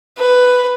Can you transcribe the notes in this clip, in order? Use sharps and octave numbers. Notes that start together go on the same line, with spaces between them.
B4